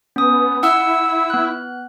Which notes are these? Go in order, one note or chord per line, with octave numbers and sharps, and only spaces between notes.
B3 C#4 D#6
E4 F#5 E6
B3 F#6